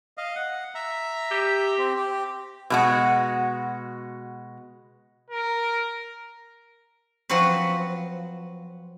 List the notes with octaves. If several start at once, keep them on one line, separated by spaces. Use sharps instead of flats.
D#5 F5
F#5
E5 A#5
G4
C4
G4
B2 G#3 F#4
A#4
F3 F#3 C4 F#4 B4